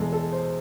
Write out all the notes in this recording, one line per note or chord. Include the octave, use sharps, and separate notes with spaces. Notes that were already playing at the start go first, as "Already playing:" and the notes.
Already playing: E2 B2 G#3 A4
A4
C5